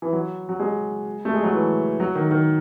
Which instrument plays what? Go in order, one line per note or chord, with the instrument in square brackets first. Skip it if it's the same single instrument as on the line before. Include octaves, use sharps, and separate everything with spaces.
[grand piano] E3
F#3
F#3
G#3
A3
G#3
F#3
E3
F#3
D#3
D#3